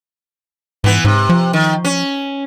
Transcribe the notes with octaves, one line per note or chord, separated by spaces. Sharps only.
G#2 E3 B3
G#2 C3
F3
D#3
C#4